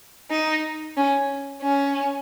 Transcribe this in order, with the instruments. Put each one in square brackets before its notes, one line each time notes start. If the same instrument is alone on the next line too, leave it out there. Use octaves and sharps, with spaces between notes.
[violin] D#4
C#4
C#4